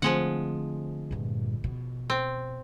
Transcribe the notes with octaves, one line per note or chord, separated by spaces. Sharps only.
D3 F3 G#3 A3 C4 F#5
G2 A#2
B2
C4